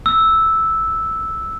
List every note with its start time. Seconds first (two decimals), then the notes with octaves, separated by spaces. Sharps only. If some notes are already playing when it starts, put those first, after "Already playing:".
0.06 E6